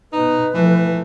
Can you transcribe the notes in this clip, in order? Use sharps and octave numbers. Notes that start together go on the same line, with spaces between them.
B2 D#4 B4
E3 F3 A3